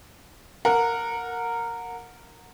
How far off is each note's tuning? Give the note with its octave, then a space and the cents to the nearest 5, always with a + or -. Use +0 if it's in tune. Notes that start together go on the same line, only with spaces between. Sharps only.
A#4 -10 F#5 -25